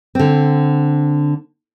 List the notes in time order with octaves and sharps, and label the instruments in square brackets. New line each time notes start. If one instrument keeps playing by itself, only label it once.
[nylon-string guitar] D3 C4